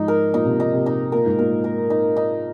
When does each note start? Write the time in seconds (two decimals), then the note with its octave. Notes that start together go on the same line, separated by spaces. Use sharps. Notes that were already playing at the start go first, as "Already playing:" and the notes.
Already playing: G#2 F3 D#4
0.08 A#4
0.33 A#2 D#4
0.45 C3
0.57 A#2 D#4
0.73 C3
0.86 D#4
1.12 A#2 A#4
1.26 G#2
1.39 A#2 A#4
1.64 A#4
1.90 D#4
2.16 D#4